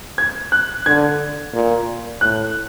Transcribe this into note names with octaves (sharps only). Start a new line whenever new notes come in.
G#6
F#6
D3 G#6
A#2
A2 F#6